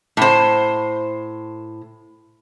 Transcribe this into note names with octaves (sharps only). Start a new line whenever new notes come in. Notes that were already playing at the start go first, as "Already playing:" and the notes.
A2 C5